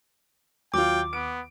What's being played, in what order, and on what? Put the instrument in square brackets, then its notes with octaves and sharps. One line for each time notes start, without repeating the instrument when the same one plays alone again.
[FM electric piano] D#2 [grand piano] F#3 F4 [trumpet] G5 [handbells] D6
[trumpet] B3 [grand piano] D7